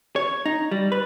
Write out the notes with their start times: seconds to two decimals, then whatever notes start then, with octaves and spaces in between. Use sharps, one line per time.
0.16 C#5
0.46 D#4
0.71 G3
0.92 B4